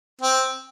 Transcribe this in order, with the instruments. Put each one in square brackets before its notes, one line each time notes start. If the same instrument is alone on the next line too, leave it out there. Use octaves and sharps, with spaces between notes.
[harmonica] C4